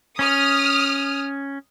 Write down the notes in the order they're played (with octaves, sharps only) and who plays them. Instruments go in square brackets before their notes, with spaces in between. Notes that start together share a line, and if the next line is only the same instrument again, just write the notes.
[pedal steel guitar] C#4 [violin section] D#6 F6